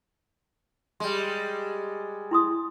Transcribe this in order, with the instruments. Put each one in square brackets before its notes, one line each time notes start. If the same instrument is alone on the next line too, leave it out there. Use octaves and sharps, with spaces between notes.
[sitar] G3 G#3 [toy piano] C6
[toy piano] E4 C6 D#6